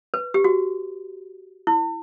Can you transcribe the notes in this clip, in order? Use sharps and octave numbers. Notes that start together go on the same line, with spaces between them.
B4
G4
F#4
E4